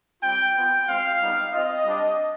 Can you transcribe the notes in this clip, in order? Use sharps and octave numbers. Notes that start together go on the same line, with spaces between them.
G3 C4 F4 G5
B3 F4
G#3 C4 F4 F5
G3 B3 D#4
C4 F4 D#5
G3 D4 G4